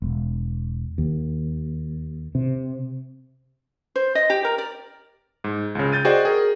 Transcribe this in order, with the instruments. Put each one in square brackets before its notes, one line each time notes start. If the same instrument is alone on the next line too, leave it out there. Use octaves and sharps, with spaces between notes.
[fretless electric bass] E1
D#2
C3
[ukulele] C5
D#5
G4
A#4
D5
[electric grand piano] G#2
C#2 C#3
G6 A6 D#7
F#4 G#4 C5 D5 D#5 G5
G#4 A#4